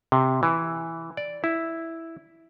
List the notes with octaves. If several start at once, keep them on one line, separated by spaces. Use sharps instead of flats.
C3
E3
D5
E4